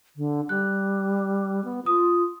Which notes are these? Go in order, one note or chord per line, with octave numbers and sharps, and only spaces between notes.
D3
G3 F#6
B3
F4 D#6